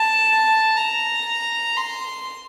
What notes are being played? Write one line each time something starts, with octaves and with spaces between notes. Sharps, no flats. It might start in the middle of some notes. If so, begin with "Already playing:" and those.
Already playing: A5
A#5
C6